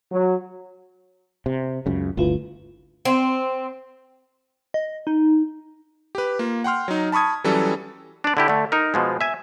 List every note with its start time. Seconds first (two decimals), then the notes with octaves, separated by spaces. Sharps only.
0.12 F#3
1.46 C3
1.86 C#2 F#2 C#3 G#3
2.17 G1 D2 E4 F4 B4
3.05 C4
4.74 D#5
5.07 D#4
6.15 G4 B4
6.39 A#3 F4
6.64 F#5 G5 C6 F6
6.88 F#3 D#4
7.12 A5 B5 C#6 D#6 G#6
7.44 E3 F#3 G3 C#4 A4
8.24 D4 D5
8.37 D3 E4 G4
8.48 D3 A3
8.72 D#4 A#4
8.94 B2 F3 G#3
9.21 E5 G#5